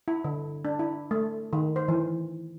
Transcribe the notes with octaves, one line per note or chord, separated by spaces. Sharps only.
E4
D3
D4
E4
A3
D#3
C5
E3